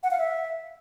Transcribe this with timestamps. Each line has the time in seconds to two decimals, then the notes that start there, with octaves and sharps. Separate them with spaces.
0.03 F#5
0.11 F5
0.18 E5